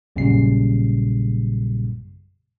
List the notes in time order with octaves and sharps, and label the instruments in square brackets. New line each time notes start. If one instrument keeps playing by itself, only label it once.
[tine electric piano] A#1 F#2 A#2 C#3 G3 C7